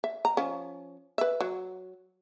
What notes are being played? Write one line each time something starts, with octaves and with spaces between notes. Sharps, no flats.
E5
A#5
F3 C#4
B4 E5
F#3